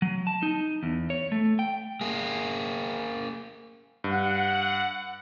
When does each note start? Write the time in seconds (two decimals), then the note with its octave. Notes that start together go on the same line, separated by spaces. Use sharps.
0.02 F#3
0.27 A5
0.43 D#4
0.83 E2
1.10 C#5
1.32 A3
1.59 G5
2.01 A#3 G#4
4.04 G2 F#5